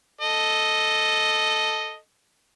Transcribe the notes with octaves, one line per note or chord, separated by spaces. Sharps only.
A4 D#5